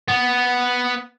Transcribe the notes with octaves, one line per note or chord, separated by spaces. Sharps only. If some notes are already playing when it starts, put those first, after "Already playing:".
B3